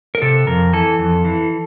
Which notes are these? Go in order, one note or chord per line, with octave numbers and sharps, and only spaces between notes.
A#4
C3 A4
F2 A#4
E3 A4
F2
E3